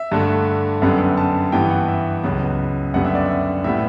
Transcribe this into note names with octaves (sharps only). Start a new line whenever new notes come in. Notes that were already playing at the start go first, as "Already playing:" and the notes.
Already playing: E5
G2 D3 A3
F#2 D3 G3 B3
A5
G2 E3 B3 G5
F#5
E5
C#2 C#3 F#3 B3
F#2 D3 G3 B3 F#5
E5
D5
E5
A2 G3 B3 E5